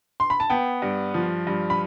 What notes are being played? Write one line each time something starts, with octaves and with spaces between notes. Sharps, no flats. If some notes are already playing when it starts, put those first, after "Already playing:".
C6
B5
A5
B3 G5
G2
F3
G2
B5